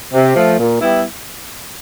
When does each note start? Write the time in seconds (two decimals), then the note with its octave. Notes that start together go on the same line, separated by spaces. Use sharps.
0.13 C3
0.35 F3 A3
0.58 A#2
0.80 G3 B3 E4